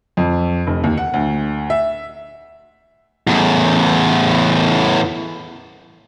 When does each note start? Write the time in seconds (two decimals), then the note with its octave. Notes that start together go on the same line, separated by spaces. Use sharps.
0.17 F2
0.67 F1
0.84 D#2
0.97 F#5
1.14 D2
1.70 E5
3.27 E2 A2